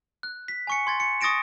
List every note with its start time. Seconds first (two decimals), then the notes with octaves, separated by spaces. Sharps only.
0.23 F#6
0.48 B6
0.67 G#5 C#6 C#7
0.87 C6 G#6 A6
1.00 C#7
1.21 C#6 D#6 A6 A#6 D7 E7